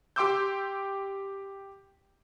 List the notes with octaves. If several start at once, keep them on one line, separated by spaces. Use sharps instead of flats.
G4 G5 C6 D6 E6 G6